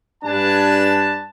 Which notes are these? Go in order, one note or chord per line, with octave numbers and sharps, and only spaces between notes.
G2 D4 B4 G#5 A5